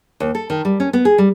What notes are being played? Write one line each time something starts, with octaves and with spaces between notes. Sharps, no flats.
D#2
A4
D#3
G3
C#4
B3
G#4
G3